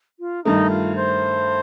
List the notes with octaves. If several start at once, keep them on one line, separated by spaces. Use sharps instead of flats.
F4
G2 D#3 A3 D#4
F4
C5